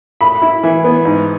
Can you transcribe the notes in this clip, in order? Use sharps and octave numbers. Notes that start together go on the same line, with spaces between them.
A2 B5
E4
E3
B3
G#2